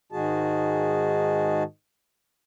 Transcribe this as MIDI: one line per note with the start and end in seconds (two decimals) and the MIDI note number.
0.12 1.63 44
0.12 1.63 51
0.12 1.63 56
0.12 1.63 66
0.12 1.63 68
0.12 1.63 81